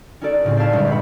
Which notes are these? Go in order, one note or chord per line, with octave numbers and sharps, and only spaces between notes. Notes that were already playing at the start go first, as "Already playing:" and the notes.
C#4 D#4 F#4 A4 D5
A2 C#3 C4
C5 D5 E5 F5 A5 G#6
G1 A#2 G#3 C#4 E4 G6
D#1 G2 F#5 B5